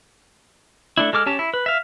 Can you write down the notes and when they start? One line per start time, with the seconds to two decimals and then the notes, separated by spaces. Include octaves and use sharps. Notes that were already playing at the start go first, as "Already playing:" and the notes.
0.97 A3 D4 E4
1.13 G#3 A4 D6 F6
1.26 C#4 G4 A5
1.39 E4
1.54 B4
1.66 E5 F5